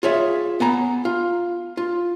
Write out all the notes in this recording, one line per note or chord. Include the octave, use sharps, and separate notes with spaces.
F4 G#4 C#5 E5
B3 G#5 A#5 B5
F4
F4